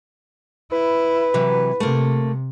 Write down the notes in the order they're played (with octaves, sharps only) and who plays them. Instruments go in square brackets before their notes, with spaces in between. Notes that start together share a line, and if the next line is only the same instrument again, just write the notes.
[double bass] E4 [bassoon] B4
[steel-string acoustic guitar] C3 E3 F#3
[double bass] C3 [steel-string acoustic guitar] A3 A#3